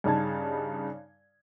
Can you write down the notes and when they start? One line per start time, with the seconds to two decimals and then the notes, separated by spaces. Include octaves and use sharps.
0.04 G2 C#3 D#4 A5 G#6